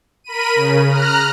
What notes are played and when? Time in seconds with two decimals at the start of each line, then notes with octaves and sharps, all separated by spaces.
0.24 A#4 B5 D#7
0.55 C#3
0.88 A#5 F6 F#6